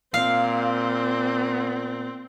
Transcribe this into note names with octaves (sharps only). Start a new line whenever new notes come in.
A#2 C4 F5